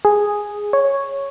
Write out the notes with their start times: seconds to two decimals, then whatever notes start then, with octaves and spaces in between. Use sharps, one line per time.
0.05 G#4
0.73 C#5